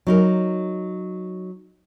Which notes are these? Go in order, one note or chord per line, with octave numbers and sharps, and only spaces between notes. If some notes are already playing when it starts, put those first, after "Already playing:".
F#3 D#4 A#4